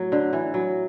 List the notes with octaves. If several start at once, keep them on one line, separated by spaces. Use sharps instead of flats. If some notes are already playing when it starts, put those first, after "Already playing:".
Already playing: A2 F#3
D3
E3
F#3